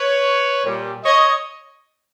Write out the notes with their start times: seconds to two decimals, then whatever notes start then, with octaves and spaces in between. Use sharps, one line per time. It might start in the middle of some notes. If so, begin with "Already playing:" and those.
Already playing: B4 C#5
0.64 A#2 G3
1.04 C#5 D#5